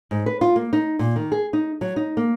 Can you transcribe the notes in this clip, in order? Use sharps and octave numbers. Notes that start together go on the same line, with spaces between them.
G#2
B4
F4
A#3
D#4
A#2
D#3
G#4
D#4
F#3
D#4
A#3